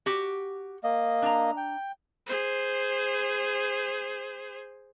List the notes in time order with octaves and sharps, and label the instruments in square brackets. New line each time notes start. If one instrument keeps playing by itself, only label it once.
[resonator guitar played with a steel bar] F#4 G4
[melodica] A#3 D#5
[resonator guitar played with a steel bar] D4 A#5
[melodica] G5
[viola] G#4 C5